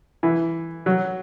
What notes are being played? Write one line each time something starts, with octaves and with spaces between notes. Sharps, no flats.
E3
F#3